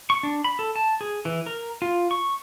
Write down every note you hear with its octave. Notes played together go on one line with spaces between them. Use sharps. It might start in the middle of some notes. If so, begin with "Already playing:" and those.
C#6
D4
B5
A4
A5
G#4
E3
A#4
F4
C#6